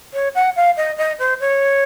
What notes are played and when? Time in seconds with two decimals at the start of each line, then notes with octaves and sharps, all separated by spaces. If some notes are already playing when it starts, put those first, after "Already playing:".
0.14 C#5
0.35 F#5
0.56 F5
0.77 D#5
0.98 D#5
1.19 C5
1.40 C#5